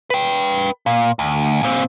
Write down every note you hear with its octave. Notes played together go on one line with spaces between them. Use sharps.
B4 G5
A#2
D2
A#2 C4